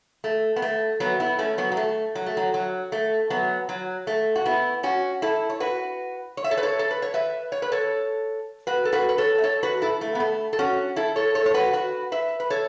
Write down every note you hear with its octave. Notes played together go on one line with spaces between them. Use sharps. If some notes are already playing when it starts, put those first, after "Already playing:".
A3
B3
A3
F#3 B3
B3 E4
A3 C#4
F#3 B3
F#3
A3
F#3
A3
F#3
F#3
A3
F#3 B3
F#3
A3
F#4
B3 E4
C#4 F#4
E4 A4
C#5
F#4 B4
C#5
E5
A4 C#5
B4
A4 C#5
A4
B4
C#5
B4 E5
C#5
B4
A4 C#5
F#4 B4
A4
F#4 B4
B4
A4 C#5
E5
A4 C#5
F#4 B4
E4 A4
A3
B3
A3
A4
C#4 F#4
E4 A4
A4 C#5
A4 C#5
C#5
F#4 B4
F#4 B4
B4 E5
B4
A4 C#5